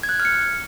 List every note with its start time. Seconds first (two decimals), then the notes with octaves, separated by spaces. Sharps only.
0.03 G#6
0.09 F#6
0.14 G#6
0.20 F6
0.25 C#7